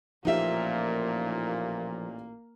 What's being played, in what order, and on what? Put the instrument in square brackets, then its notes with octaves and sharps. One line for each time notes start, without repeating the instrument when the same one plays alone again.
[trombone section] A1 A#2 [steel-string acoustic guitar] F3 E5 [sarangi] A#3 [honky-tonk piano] D#4 F4 G4